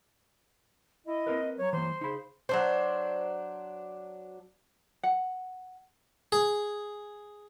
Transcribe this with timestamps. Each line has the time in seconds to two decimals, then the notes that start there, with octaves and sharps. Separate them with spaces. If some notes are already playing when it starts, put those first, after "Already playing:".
1.06 E4 D#5
1.27 C4 A#4 B4
1.58 F#3 C#5
1.73 E3 A#3 C5
2.01 C#3 D#4 B5
2.49 F#3 D4 C5
5.03 F#5
6.32 G#4